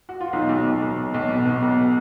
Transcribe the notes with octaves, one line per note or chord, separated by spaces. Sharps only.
F#4
F4
B1 D#4
B1
B1
B1
B1
B1
B2
B2
B1